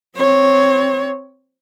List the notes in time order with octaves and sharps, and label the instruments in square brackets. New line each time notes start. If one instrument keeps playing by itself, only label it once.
[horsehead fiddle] C4 C#5